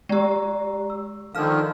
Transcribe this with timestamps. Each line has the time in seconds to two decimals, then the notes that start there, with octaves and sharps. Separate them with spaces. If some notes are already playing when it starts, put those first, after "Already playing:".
0.09 G#3 G4 D5 A#5 E6
0.90 E6
1.35 D3 D#3 F3 F5 F6